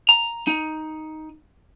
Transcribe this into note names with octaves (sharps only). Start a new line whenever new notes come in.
A#5
D#4